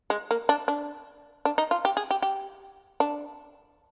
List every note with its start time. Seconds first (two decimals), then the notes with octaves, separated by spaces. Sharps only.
0.10 G#3
0.31 A#3
0.49 D4
0.68 D4
1.45 D4
1.58 D#4
1.71 F4
1.85 G4
1.97 G#4
2.11 G4
2.22 G4
3.00 D4